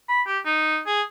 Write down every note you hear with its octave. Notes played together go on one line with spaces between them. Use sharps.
B5
G4
D#4
G#4